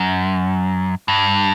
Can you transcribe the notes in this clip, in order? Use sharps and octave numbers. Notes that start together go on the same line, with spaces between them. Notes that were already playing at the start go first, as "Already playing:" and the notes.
Already playing: F#2
G2